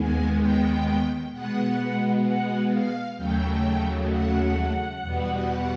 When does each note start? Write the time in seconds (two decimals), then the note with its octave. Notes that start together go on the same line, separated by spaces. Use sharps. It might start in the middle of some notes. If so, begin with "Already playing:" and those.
Already playing: D#2 D#3 G#3 B3 G#5
0.40 G5
1.32 B2 G#3 B3 F#5
2.25 F#5
2.72 F5
3.17 D#2 C#3 F#3 A3 G5
4.10 F#5
5.02 E2 B2 G3 B3